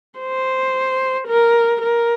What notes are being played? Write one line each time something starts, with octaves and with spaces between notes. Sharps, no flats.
C5
A#4
A#4